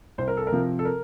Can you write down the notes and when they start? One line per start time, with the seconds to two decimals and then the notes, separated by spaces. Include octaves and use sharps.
0.18 C2 C5
0.28 A#4
0.37 A4
0.47 A#4
0.52 C3 F3
0.79 A4
0.85 A#4